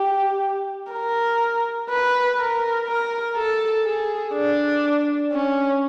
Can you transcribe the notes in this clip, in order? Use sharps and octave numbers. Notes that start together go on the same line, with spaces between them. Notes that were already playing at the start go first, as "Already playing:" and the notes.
Already playing: G4
A#4
B4
A#4
A#4
A4
G#4
D4
C#4